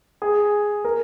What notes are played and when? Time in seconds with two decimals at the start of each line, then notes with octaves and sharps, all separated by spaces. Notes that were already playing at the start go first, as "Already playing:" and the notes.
0.22 G#4
0.85 A#4